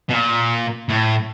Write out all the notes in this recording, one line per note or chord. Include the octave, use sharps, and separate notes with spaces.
B2
A#2
A2